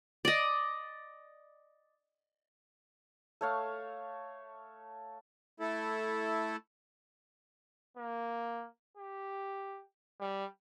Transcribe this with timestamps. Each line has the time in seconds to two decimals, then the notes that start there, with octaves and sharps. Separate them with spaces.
0.25 D5 D#5
3.41 A3 C#5 F5
5.60 A3 E4 A4
7.97 A#3
8.97 G4
10.20 G3